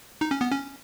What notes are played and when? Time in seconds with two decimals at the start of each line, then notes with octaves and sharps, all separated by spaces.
0.21 D#4
0.31 C#4
0.41 B3
0.51 C#4